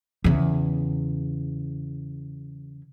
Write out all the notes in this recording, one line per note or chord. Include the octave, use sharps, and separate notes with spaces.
E2 C#3